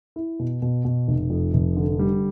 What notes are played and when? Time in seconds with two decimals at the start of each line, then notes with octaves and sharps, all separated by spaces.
0.16 E4
0.39 B2
0.62 B2
0.85 B2
1.08 F1
1.30 F2
1.53 F1
1.76 D3
1.99 G3